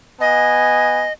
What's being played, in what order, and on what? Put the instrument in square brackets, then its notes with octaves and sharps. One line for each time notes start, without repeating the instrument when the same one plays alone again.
[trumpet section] B3 G#5 [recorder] D#5